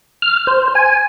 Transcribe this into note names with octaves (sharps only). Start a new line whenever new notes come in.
F6
C5
G#5